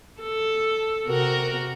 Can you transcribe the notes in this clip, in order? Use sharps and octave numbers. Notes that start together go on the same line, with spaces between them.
A4
C3 F#4 A#4